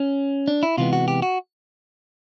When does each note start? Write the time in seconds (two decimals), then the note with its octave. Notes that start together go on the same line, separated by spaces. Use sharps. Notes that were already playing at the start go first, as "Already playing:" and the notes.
Already playing: C#4
0.48 D4
0.63 E4
0.78 C3 E3 G#3 B3 F4
0.93 F#4
1.08 G4
1.22 F#4